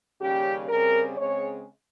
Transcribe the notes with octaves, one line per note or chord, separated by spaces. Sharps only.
D#2 C#3 G3 C#4 G4
C#3 G3 C4 A#4
C#3 G#3 C4 C#5